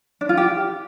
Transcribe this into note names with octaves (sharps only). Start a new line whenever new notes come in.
D4
F4
G4